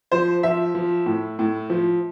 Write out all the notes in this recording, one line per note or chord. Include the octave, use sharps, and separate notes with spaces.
F3 C5
F3 E5
F3
A2
A2
F3